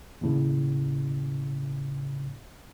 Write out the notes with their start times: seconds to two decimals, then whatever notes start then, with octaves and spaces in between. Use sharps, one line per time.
0.21 D#2 A2 C#3